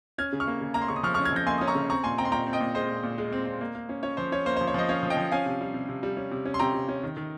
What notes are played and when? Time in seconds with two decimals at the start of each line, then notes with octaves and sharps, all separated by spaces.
0.18 C#4 F6 G#6
0.33 C#3
0.40 C#6 F6
0.47 A#3
0.61 C#3
0.74 A#3 A#5
0.82 C6
0.88 C#3 C#6
0.96 D#6
1.03 F3 C#6 F6
1.14 C#4 C#6 F6
1.25 F6 G#6
1.32 F3 G6 A#6
1.47 A#3 G#5 C6
1.58 C#4 D#6
1.68 A#5 C#6
1.75 C#3
1.90 C4 A#5 C#6
2.04 A#2 G#5 C6
2.18 C4 G5 A#5
2.25 C6
2.32 A#2 G5 A#5
2.47 C4
2.53 D#5 G5
2.60 A#2
2.75 G#3 C5 D#5
2.89 A#2
3.03 A#2
3.18 G#3
3.32 C4
3.46 C4
3.61 A#3
3.75 A#3
3.89 C#4
4.03 C#4 C#5
4.17 F3 C5
4.32 C#4 C#5
4.46 A#3 C5
4.56 F3 C5
4.67 C#5
4.74 F3 C5 D#5
4.89 C#4 C#5 F5
5.03 F3
5.10 D#5 G5
5.17 F3
5.32 C#4 F5 G#5
5.46 C3
5.61 G3
5.74 C3
5.89 C3
6.03 G3
6.17 C#4
6.31 C3
6.45 C#4
6.54 C6
6.59 C3 G5 A#5
6.74 C3
6.89 C#4
7.03 D#3
7.17 D#3